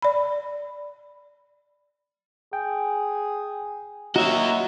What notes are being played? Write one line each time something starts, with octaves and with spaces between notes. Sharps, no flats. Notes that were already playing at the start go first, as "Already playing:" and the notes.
D5 B5
G#4 G5
F#3 A#3 F#4 D#5 E5 A#5